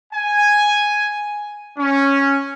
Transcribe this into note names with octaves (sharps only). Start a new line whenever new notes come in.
G#5
C#4